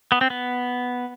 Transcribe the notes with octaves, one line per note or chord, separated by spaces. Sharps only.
B3
C4
B3